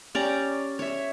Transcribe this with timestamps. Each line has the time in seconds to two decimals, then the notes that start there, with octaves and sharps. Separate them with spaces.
0.15 C#4 G4 D5 A#5
0.79 C#5 E5